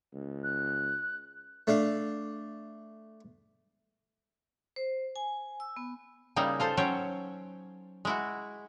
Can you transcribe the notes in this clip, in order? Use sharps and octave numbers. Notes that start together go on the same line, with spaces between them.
C#2
F#6
A3 D4 D5 F5
C5
G#5
E6
B3
C#3 G3 A#3 D#4 E4 G#4
F4 A4 C5
F#3 C#4 C5 C#5 G5
G#3 E4 F#4